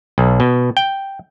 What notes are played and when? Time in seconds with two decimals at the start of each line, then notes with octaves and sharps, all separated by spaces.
0.18 B1
0.40 B2
0.77 G5